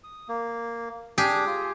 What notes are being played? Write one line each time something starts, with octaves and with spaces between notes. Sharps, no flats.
D#6
A#3
D4 G4 G#4
F4